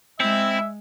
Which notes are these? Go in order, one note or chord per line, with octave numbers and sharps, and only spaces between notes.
G#3 C4 E4 E5